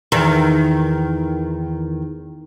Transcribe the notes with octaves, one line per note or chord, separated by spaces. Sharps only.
E2 D#3